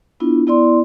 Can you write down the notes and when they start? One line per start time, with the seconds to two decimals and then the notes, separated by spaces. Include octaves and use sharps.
0.20 B3 D4 E4 F4
0.47 B3 E4 D5 C6